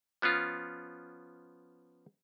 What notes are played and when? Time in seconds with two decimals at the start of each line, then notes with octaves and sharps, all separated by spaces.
0.22 F3 B3 C#4 F4